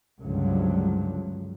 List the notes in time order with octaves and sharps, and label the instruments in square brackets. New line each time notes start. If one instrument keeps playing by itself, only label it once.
[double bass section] C#2 G2 D3 F3 F#3